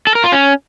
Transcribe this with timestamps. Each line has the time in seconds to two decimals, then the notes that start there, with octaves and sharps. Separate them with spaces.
0.07 A4
0.15 A#4
0.24 F4
0.32 C#4